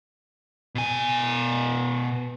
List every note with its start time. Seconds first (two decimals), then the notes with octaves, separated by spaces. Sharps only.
0.75 B2 G#5